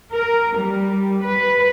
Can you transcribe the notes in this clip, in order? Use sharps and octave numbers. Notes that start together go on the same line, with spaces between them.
A#4
G3
B4